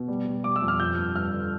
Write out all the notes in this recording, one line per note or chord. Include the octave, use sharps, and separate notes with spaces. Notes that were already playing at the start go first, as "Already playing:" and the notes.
Already playing: B2
G3
G3
G3 D6
E6
F2
F6
F3 G6
G2
G2 F6
D3